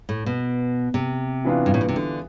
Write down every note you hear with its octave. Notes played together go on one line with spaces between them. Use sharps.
A2
B2
C3
E3 B3 D4 F4
G2
A2
B2
C3
D3